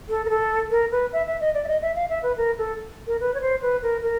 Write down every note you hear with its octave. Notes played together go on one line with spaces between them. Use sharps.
A4
A#4
A4
A#4
B4
E5
E5
D#5
D5
E5
D#5
E5
F5
E5
B4
A#4
A4
A#4
B4
C#5
C5
B4
A#4
A#4